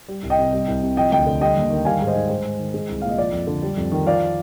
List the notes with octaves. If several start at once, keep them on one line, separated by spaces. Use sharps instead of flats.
G3
C2
D#5 G5
C3
G3
C2
C3
F3 D#5 G5
D2 D#5 G5
D3
G3 D#5 G5
D#2
D#3
G3 F5 G#5
G#2
C5 D#5
D#3
G#3 C5
G#2
D#3
G#3
C2
A#2 F5
D#5
F3 D5
F2
D3
G3
F2
D#3
F3 D5 F5